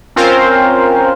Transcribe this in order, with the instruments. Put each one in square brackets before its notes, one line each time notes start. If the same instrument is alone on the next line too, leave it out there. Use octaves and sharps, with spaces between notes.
[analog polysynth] C4 C#4 F4 A#4 C5 F5